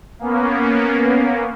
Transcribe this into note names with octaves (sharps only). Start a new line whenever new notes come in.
A#3 B3 C#4